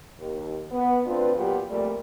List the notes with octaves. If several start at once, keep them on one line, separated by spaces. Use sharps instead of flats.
D#2
B3
D2 C4 D4 F4 B4
A#2 F#3 B3 F4 G4
F2 A#2 G3 A3 A#4 D5